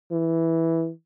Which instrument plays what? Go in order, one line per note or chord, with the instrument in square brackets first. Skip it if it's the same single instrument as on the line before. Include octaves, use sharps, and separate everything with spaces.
[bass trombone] E3